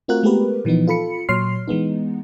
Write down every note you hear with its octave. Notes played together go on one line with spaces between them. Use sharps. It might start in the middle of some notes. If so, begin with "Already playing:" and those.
A3 C4 F4 F#4 A#4 F#6
G#3 A3 B3 G4 A#4 B4
A#2 E3 F3 B3 D#4
F4 A4 B5 C#7
A#2 F#3 C#5 C6 F6 C7
E3 G#3 B3 D#4